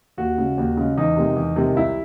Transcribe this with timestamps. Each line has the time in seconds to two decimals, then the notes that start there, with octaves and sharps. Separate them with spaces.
0.17 D#2 F#4
0.38 C#3 G#3
0.58 D#2
0.77 C#3 G#3
0.97 E2 D#4
1.16 C3 D#3 G#3
1.36 E2
1.56 C3 D#3 G#3
1.76 C2 E4